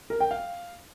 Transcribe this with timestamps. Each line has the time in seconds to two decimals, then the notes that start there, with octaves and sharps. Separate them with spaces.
0.10 A#4
0.20 G5
0.31 F5